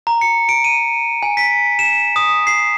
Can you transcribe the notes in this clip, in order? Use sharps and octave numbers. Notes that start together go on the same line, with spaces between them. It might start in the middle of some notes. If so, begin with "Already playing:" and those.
A#5
C#7
D7
D#7
G#5
B6
E7
D#6
C7